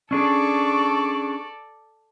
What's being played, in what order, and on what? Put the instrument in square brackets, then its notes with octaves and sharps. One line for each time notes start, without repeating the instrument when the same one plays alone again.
[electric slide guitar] C#4 D4 G#4 [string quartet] A4 D5 [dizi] C#6